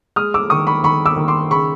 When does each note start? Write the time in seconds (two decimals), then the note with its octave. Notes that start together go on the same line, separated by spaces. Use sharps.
0.16 G#3 D#6 F6
0.34 D6 E6
0.50 D#3 C#6 D#6
0.67 B5 C#6
0.83 D#3 B5 C#6
1.06 D6 E6
1.17 D#3
1.28 C6 D6
1.50 C#3 B5 C#6